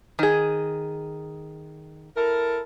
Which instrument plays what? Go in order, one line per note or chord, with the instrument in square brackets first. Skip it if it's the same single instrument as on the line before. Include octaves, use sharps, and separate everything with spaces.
[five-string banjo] D#3 G#4
[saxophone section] E4 A4 A#4